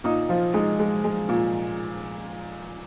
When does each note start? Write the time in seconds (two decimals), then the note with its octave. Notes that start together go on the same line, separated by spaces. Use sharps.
0.04 A#2 D#4
0.29 F3 F4
0.54 G#3 D#4
0.79 G#3
1.04 G#3
1.29 A#2